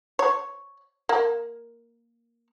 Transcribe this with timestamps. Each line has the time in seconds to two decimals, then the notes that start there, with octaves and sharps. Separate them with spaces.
0.19 C#5
1.09 A#3